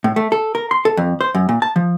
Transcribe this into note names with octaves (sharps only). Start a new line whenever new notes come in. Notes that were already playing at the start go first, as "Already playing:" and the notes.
A2
A3
A4
A#4
C6
A4
F2
C5
F#2
A#2
A5
F3